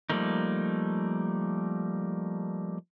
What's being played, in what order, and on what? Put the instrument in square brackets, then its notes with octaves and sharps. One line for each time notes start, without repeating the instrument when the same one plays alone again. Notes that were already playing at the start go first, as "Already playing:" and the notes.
[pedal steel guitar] F3 G3 A3 A#3 D#4